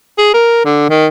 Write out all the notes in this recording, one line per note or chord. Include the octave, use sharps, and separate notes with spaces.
G#4
A#4
D3
D#3